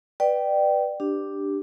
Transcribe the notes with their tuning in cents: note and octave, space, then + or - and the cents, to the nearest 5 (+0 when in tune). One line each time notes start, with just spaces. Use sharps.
B4 +0 D5 +25 G5 -15
D4 +0 G4 +0